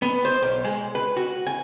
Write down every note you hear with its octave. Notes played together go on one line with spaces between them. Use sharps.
B3
C5
B1
G#3
B4
F#4
G#5